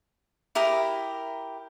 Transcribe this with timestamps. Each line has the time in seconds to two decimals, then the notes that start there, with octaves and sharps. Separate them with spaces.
0.55 E4 G4 A#4 D#6